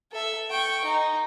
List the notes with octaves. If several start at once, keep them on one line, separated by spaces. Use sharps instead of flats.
A4 E5
G5 C#6
D#4